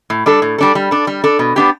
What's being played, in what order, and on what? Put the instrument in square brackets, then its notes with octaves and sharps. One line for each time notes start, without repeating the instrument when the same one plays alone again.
[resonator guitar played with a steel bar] A2
G3 D4 A4
A2
G3 D4 A4
G3
D4 A4
G3
D4 A4
B2
B3 D4 G4